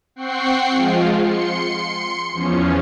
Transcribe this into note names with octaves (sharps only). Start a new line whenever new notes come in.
C4 F#5 G5 C#6 C7
F3 G#3 F4
C6 C#7
E2 F3 C#4